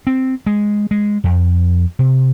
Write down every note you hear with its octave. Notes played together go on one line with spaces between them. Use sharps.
C4
G#3
G#3
F2
C3